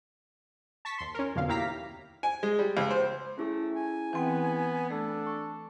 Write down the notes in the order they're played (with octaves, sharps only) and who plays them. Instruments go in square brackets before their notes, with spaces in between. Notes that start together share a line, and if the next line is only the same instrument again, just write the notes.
[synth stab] A5 C#6 B6
D#2 C6
C#4 A#4
B1 F2 B2 D3 F5
D#2 E4 G4 F5 A#5 B6
[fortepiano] G#5
G#3
G3
C#2
C5
[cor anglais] A3 [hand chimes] C#4 E4 G#4
[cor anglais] G#5
[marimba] E3 C4 G5 [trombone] B3
[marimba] A3 [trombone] D4 [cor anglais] A4
[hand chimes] C#6